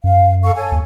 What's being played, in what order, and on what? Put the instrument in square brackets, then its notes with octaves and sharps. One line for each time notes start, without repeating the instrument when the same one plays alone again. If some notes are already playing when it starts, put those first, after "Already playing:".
[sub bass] F#2 [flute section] F5
[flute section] A4 F5 C#6
A4 C#5 G#5
[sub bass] D#2